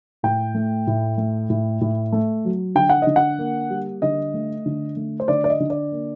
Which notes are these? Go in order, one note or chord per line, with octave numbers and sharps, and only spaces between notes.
A2 G5
A3
A2
A3
A2
A2
A3
F#3
D3 G5
F#5
D3 D#5
F#5
A#3
G3
D3 D#5
A3
D3
A3
C5
D3 D5
D5
D#5
D3
D5
A#3